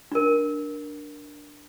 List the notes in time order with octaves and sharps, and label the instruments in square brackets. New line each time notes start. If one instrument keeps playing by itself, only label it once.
[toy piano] D4 A#4